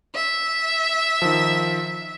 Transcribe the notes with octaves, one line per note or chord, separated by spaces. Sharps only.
E5
D#3 F3